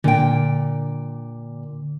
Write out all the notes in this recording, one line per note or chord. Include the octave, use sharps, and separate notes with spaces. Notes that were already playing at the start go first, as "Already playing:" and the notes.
A#2 D3 G5